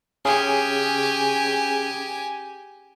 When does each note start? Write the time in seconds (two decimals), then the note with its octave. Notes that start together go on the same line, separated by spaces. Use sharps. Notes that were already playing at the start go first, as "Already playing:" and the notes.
0.25 C#4 G4 G#4 G#5